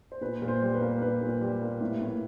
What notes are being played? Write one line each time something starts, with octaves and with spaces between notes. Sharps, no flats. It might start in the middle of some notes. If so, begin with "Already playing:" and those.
C5
A#2 B4
A#2
C5
G3
B4
A#3
A#2 B4
A#2
G3
A#3
A2
A2